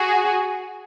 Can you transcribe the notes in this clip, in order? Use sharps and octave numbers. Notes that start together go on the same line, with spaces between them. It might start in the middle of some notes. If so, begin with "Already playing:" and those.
Already playing: F#4 G#4